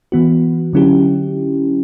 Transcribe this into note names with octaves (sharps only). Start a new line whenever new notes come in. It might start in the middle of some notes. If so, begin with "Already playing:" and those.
E3 B3 F#4
D3 F#3 C#4 E4 G4